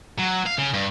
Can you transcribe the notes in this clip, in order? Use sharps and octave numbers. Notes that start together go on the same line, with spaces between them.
F#3
F5
C#3
G2